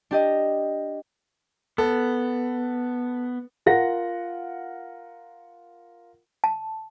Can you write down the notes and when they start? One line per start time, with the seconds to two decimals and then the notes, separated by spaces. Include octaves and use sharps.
0.11 D4 G4 D#5
1.78 B3 A4
3.66 F4 A#4 F#5 A#6
6.44 A5